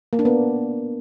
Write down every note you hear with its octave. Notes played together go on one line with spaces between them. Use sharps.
A#3
D4
B3